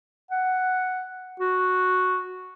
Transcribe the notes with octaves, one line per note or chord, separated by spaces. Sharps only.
F#5
F#4